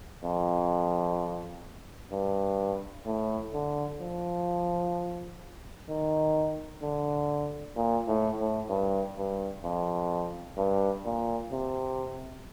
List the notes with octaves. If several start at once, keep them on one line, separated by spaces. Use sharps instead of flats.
F2
G2
A2
D3
F3
D#3
D3
A#2
A2
A2
G2
G2
F2
G2
A#2
C3